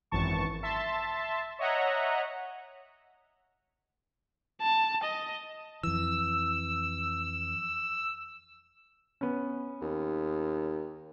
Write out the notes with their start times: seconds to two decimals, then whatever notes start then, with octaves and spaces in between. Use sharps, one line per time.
0.11 G#1 F#2 E3 A5 C#6
0.63 E5 A5 C6
1.59 C#5 D#5 E5 F#5 A#5
4.62 A5
5.04 D#5
5.83 F2 E3 E6
9.21 B3 C#4
9.82 D#2